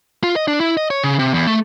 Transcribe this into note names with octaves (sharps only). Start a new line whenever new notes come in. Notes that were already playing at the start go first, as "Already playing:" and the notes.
F4
D#5
D4
E4
D#5
C#5
C#3
C3
E2
A3